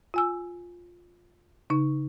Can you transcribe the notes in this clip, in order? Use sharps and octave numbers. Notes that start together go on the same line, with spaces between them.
F4 G#5 E6
C#3 D#4